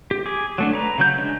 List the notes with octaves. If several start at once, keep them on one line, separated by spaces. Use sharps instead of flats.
G4
G#4 D6
F#3 A3 D4
B4 A#5
C#3 F#3 G6
G#3 D4